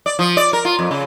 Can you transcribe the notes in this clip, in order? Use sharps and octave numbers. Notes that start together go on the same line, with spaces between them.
D5
F3
D5
A#4
F4
F2
C#3